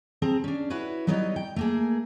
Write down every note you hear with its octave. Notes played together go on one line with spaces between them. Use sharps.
C4 G#4 A5 A#5
C#4 D4
E4 F#4 B4 C#5
F#3 G3 B3 D#4 C#5 D#5
G5
A3 A#3 G#4